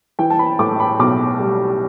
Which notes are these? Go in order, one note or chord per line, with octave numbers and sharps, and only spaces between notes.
E3 G5
A5
B5
A2 D6
B5
B1 D6
G3